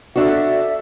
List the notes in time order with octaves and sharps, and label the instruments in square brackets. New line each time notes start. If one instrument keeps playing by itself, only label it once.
[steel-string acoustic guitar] D4 F#4 [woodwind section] A4 E5